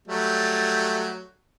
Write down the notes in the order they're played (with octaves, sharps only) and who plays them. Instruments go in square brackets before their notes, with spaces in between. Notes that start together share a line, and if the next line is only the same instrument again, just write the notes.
[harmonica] F#3 G3 A3